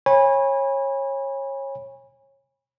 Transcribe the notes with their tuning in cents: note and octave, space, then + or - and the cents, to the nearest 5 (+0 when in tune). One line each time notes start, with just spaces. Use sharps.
C#5 -25 G#5 -30 B5 -20